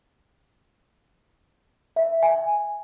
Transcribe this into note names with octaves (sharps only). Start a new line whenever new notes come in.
E5
G#5